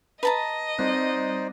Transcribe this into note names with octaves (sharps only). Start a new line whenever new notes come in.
B4 D#5 A5 A#5
G3 C4 D#4 C5 D5 F#6